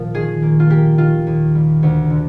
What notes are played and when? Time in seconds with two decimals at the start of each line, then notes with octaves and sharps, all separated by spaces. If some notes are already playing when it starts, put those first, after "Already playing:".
Already playing: A#2 F3
0.14 D#3 G#4
0.43 A#3
0.60 F4
0.70 A#3 G4
0.98 D#3 F4
1.27 D#2
1.55 G3
1.83 D2
2.10 D3